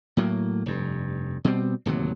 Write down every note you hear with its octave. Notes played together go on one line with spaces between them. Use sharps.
A2 F#3 A#3
F1 G2
B2 G3 C4
D1 D#2 C3 F#3